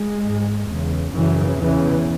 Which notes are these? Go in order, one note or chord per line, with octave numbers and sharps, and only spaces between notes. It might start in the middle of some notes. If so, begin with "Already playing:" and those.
Already playing: G#3
G#2
E2 C#3
F#2 C#3 E3
E2 C#3 E3